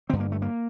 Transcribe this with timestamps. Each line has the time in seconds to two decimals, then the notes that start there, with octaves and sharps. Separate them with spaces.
0.09 G2 D3 C4
0.20 A#3
0.32 A3
0.42 A#3